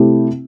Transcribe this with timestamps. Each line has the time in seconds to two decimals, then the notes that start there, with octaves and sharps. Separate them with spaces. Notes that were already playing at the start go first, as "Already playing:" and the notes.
Already playing: C3 A3 E4 G4